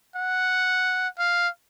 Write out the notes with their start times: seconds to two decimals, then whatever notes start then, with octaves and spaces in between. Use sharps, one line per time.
0.16 F#5
1.18 F5